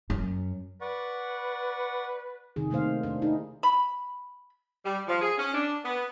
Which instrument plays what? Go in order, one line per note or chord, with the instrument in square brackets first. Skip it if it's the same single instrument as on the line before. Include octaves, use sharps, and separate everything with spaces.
[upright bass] F#2
[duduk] B4 [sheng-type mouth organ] D5 F#5 C#6
[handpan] C3 D#3 G#4
C3 D#3 A3 A#3 C5 F5
D4 C5
D#4 E4 G#4
[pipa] B5
[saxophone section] G3
F3
G#4
C#4
D4
B3